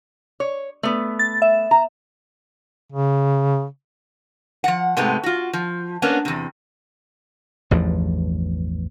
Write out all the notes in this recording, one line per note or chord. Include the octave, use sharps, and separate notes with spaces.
C#5
A3 B3
A6
E5
A#5
C#3
F3 F#5
G#2 C3 G#3 A3 B3
F4 F#4
F3
A#3 B3 C#4 D4
E2 C3
A1 E2 G2 F3